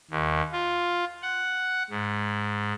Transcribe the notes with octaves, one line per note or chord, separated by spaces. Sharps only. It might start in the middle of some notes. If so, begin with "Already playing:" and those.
D#2
F4
F#5
G#2